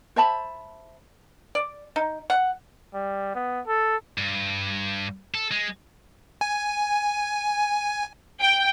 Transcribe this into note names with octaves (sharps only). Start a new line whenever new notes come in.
C5 E5 A5 B5
D5
D#4
F#5
G3
B3
A4
G2
A4
G#3
G#5
G5